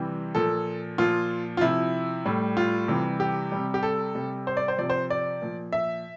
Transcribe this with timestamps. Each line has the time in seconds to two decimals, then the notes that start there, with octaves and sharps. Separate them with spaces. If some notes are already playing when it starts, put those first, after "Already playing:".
Already playing: C3 E3 G3
0.35 A#2 F3 A4
0.98 A#2 F3 F4
1.57 F4
1.61 C3 F3 E4
2.26 A2 G3
2.57 F4
2.88 C3 E3 G3
3.20 G4
3.52 C3 G3
3.74 G4
3.83 A4
4.15 C3 G3
4.47 C5
4.57 D5
4.68 C5
4.78 C3 F3 D5
4.90 C5
5.10 D5
5.42 A#2 F3
5.73 E5